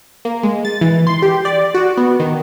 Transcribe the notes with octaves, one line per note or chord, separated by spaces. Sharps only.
A#3
G#3
A6
E3
C6
G4
D5
F#4
B3
D#3